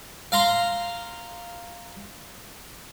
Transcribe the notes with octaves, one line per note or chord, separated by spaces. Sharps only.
F5 A#5 C6